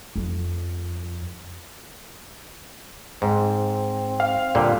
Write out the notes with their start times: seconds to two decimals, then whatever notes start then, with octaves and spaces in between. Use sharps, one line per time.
0.16 F2
3.22 G#2 C4
4.20 F5
4.55 A#2 D3 G3